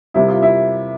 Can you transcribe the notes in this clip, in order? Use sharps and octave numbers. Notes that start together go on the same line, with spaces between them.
C3 G3 A#3 E4
F4
E4